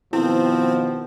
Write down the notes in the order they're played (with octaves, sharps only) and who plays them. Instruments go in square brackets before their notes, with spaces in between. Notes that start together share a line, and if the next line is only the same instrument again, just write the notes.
[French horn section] B2 D#3 B3 [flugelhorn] F3 [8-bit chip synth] C4 [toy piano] E4